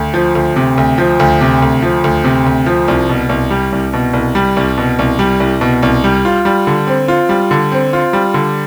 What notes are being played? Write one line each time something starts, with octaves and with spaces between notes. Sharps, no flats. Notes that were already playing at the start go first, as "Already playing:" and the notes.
Already playing: D2
F3
D2
C3
D2
F3
D2
C3
D2
F3
D2
C3
D2
F3
C2
B2
C2
G3
C2
B2
C2
G3
C2
B2
C2
G3
C2
B2
C2
G3
F4
G3
D3
C4
F4
G3
D3
C4
F4
G3
D3